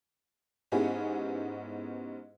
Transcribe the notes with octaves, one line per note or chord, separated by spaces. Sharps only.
G#2 B3 C#4 E4 G4 G#4